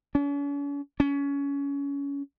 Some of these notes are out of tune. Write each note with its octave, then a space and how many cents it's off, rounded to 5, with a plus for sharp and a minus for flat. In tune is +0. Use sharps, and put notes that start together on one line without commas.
C#4 +45
C#4 +25